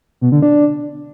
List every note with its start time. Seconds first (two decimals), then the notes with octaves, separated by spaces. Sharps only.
0.21 B2
0.32 D3
0.42 D4